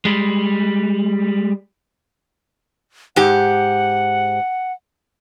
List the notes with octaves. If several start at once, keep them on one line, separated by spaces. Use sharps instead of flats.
G3 G#3
G#2 G4 F#5